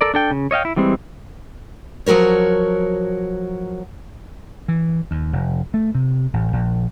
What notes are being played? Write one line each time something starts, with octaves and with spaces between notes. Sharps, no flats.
A4 A#4 D5
D4 A4 G5
C#3
C#5 D#5 F5 G5
E4
E3 G3 G#3 C4
F3 F#3 F#4 A#4 C#5
E3
D#2
F1
A3
C3
A1
A#1